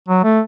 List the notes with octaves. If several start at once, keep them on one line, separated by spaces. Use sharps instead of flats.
F#3
A3